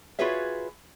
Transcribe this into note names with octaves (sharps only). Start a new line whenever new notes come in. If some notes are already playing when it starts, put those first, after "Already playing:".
F4 F#4 G#4 B4 C#5 E5